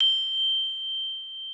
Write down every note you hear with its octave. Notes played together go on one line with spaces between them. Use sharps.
G7